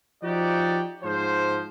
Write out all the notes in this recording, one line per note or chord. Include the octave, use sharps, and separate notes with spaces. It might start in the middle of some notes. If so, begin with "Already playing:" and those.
F3 D#4 F#4 G4 D5
G#2 F3 C5